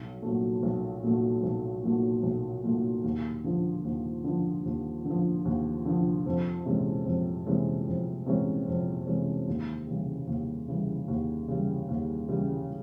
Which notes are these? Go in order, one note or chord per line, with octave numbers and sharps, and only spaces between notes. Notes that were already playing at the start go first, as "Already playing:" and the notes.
Already playing: B1
A#2 F#3 A3
B1
A#2 F#3 A3
B1
A#2 F#3 A3
B1
A#2 F#3 A3
D#2
D3 F3
D#2
D3 F3
D#2
D3
F3
D#2
D3 F3
F2
C3 E3 G#3 C#4
F2
C3 E3 G#3 C#4
F2
C3 E3 G#3 C#4
F2
C3 E3 G#3 C#4
D#2
C#3 E3 G3
D#2
C#3 E3 G3
D#2
C#3 E3 G3
D#2
C#3 E3 G3